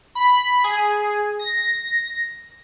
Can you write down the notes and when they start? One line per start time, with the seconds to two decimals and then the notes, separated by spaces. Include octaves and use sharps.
0.15 B5
0.64 G#4
1.39 A#6